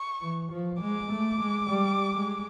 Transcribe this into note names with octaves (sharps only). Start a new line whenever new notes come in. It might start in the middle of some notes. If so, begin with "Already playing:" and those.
Already playing: C#6
E3
F3
G#3 D6
A3
G#3
G3
G#3